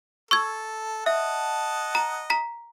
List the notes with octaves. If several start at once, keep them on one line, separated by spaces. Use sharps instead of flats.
A4 C#6 E6 G#6
D#5 E5 F#5 A5
A#5
A#5 B6